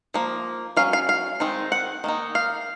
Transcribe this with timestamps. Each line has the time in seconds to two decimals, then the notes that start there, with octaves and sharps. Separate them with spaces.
0.14 F3 A#3
0.77 F#3 C#4 F5
0.93 F5
1.09 F5
1.40 D#3 G#3 C4 D#4
1.72 F#5
2.04 D#3 A#3 D#4
2.35 F5